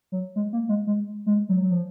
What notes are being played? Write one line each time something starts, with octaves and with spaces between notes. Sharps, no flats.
F#3
G#3
A#3
G#3
G#3
G#3
F#3
F#3
F3